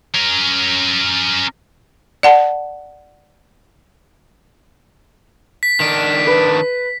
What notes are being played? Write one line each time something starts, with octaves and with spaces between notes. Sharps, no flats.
C#4 A#4
D5 F#5 A5
B6
D#3 D4
B4